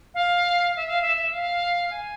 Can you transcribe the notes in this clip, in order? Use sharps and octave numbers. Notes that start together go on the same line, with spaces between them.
F5
E5
F5
E5
E5
F5
G#5